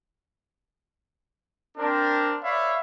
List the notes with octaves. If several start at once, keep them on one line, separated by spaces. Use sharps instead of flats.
C4 D4 A#4
B4 C#5 D5 E5 F5 B5